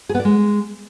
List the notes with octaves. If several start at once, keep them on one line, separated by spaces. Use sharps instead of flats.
G#4
B3
D5
G#3